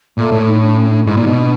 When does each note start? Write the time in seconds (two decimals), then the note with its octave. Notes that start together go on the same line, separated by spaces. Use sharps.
0.17 A#2 A3
0.32 A2
0.47 D#4
0.61 D4
0.74 C#4
0.88 D4
1.07 G#2 E4
1.17 A#2
1.22 B2 D#4
1.36 D4